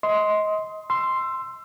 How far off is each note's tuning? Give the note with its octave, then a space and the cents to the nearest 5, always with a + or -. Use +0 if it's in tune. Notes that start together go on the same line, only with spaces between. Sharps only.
D#5 +25 C6 +0
C6 +0 E6 +20